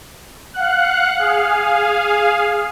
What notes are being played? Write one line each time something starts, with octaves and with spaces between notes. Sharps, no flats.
F5 F#5 F#6
G#4 F5